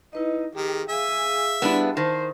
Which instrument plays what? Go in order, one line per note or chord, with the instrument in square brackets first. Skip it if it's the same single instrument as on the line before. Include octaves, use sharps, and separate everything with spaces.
[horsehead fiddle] D#4 [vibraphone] E4 B4 D#5
[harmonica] D#3 [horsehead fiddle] G4 [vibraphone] G#4
[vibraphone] G#4 F5 [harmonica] E5 [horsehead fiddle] G#5
[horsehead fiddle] G3 [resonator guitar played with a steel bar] B3 D4 E4
[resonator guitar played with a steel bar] D#3 [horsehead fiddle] C5 [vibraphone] A5